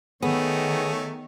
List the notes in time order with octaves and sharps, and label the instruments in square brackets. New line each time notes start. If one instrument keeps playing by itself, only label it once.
[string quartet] D#3 [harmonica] A3 C#5 [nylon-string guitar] B3 [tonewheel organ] G#4 D#6